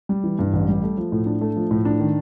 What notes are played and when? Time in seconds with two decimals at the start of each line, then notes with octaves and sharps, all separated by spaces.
0.09 G3
0.24 E3
0.39 G2
0.53 A1
0.68 G3
0.83 A3
0.97 F3
1.12 A2
1.26 D4
1.41 A3
1.56 F3
1.71 A2
1.85 D4
1.99 D#3